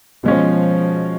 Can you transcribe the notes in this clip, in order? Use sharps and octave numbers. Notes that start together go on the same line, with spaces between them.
B2 F3 G#3 C#4